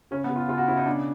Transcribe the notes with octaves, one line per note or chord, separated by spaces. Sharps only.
C#3 C#4
B3
C#3
F4
C#3 F4
F#4
C#3 E4
D#4
B2 D4